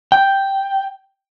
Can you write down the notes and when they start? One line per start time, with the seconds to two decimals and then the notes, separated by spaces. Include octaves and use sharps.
0.12 G5